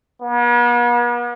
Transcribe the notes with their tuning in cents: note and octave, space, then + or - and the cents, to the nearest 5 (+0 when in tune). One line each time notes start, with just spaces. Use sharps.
B3 -45